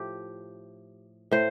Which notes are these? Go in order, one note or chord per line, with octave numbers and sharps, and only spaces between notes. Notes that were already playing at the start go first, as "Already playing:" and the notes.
Already playing: A2 F3 G4
A2 C5